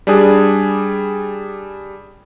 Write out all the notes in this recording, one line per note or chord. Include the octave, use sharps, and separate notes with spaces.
G3 D4 G#4